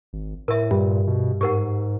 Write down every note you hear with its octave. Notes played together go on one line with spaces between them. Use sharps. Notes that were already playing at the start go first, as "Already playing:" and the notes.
G#1
A2 A#4 E5
G2 A#2
B2
G#2 G4 A#4 F#5